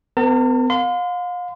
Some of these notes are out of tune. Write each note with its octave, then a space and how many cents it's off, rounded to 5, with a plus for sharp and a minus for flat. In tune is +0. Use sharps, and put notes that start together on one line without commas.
B3 +45 A#4 -15 A5 +45
F5 +35 C6 -35